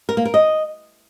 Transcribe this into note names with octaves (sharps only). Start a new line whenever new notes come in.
A#4
A#3
A#4
D#5